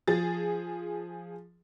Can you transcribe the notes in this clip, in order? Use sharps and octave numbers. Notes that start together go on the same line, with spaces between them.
F3 G#4 A6